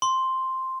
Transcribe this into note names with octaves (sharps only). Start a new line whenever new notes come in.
C6